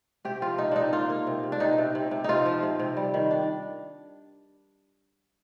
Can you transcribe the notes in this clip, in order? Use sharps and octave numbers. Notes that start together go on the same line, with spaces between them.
C3 G4
F3 F4
C3 D#4
C3 D4 D#4
A#3 F4
A#3
C3
C3
D4
C3 D#4
C3
C3
C3
C3 D#4 F4
F3
C3
C3
G3
D#3
D4